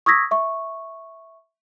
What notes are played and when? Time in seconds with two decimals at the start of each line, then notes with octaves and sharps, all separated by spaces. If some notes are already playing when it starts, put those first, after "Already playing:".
0.06 C#6 D#6 E6 G#6 A#6 B6
0.31 E5 C#6